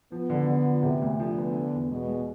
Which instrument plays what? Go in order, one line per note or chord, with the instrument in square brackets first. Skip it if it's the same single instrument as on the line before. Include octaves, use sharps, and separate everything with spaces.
[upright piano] F3 [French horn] B3
[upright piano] D3
D3
F3
C3
D2
[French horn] D3 [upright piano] F3
[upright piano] B3
B3
E2
[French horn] B2 [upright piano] G#3
[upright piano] G#3